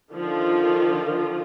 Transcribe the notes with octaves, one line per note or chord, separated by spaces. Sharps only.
D3 D#3 F3 F4